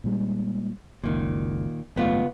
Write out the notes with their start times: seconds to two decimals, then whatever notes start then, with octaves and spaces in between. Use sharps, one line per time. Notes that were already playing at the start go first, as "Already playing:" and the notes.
0.04 A#2 G3 G#3
1.04 F#1 C#2 A#2 D#3
1.96 G#1 C#2 F#2 A3 B3 F4